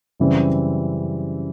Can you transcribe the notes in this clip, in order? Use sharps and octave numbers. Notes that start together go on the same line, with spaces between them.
F#2 C#3 E3 G3 C4